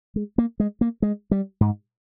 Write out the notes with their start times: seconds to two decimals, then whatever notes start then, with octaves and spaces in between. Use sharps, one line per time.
0.16 G#3
0.38 A#3
0.60 G#3
0.81 A#3
1.02 G#3
1.31 G3
1.61 G#2